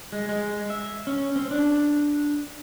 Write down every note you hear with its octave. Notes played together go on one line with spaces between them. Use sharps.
G#3
G#3
E5
C#4
C4
D4